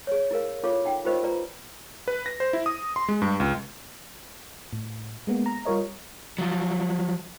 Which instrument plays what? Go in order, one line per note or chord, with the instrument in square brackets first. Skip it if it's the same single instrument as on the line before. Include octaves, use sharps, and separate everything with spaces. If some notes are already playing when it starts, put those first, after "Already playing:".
[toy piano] G#4 C#5
E4 G#4 A#4 F5
E4 F4 A4 C#5 F5 D6
D#4 F#5 G5
F4 G4 A#4 C5 D#5 F5
F4 B4 D5 A#5
[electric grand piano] B4
A#6
C5
E4
D#6
C6
G#3
G2
C#2
[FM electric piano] A2
G#3 A#3 B3
A#5
G3 F4 A#4 C#5 D#5
[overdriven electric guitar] F3 F#3